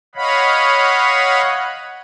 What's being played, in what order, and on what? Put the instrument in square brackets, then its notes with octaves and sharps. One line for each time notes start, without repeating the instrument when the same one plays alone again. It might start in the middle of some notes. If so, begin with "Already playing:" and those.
[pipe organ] C#5 D#5 F5 F#5 B5